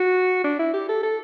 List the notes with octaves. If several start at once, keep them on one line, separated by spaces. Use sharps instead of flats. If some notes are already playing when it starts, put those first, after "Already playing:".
Already playing: F#4
D4
E4
G4
A4
A4